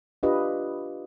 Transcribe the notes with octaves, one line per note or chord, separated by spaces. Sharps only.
D4 F4 G4 B4 D#5